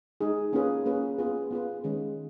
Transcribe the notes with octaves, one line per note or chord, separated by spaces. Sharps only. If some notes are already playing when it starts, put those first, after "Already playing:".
G#3 D#4 G#4
A#3 C#4 F4 G#4 B4
A#3 C#4 F4 G#4 B4
B3 F4 G#4 B4
B3 F4 G#4 B4
D#3 G#3 C#4 G#4